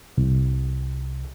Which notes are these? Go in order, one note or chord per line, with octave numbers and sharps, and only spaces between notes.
C2